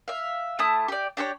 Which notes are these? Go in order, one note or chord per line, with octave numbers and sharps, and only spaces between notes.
E5 F5
A3 E4 A5 D#6
G4 D5
D4 G4 A4 C#5